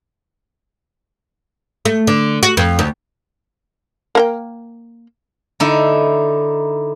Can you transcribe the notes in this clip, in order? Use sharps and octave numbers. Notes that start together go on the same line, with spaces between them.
A3
D3
F#4
F2
D2
A#3 A#4 G5
D3 D#4 E4